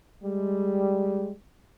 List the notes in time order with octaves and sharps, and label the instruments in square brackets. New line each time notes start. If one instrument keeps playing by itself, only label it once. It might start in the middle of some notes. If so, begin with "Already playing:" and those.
[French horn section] G3 G#3